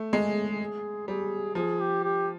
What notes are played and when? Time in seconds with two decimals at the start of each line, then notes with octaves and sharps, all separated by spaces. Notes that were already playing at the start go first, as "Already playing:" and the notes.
Already playing: A3
0.12 G#3 G#4
0.60 G#4
1.08 G3 G#4
1.55 F3 G#4
1.80 G4
2.04 G4